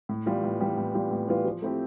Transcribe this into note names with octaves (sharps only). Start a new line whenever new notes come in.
A2
E3 G3 B3 F4
A2
E3 G3 B3 F4
A2
E3 G3 B3 F4
A2
E3 G3 B3 F4
F3
A3 C4 E4 G4